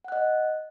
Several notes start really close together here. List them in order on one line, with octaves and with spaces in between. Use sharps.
F#5 F#6 D#5